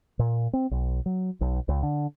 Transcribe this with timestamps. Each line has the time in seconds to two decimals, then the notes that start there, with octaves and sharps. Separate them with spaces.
0.19 A#2
0.53 C4
0.71 B1
1.06 F#3
1.41 B1
1.68 C#2
1.83 D3